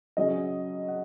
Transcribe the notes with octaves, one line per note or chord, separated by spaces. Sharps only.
C#3 F#3 C#4 D#5
F#5